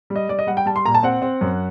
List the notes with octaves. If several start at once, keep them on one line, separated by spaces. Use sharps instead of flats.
G3
D#5
G3 D5
D#5
G3 F#5
G5
G3 A5
C6
A#2 A#5
A5
C4 F#5
C4
F#2